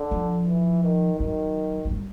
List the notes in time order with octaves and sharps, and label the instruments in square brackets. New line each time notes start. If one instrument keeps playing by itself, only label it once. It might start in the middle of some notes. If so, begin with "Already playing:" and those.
Already playing: [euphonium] D3
[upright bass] F3
[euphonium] E3
D#3
[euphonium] D#3 [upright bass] F#3
[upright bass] F#3
G3